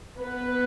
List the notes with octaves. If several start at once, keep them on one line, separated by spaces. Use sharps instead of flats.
B3 B4